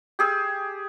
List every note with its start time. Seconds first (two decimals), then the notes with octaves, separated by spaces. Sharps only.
0.19 G4 G#4 E6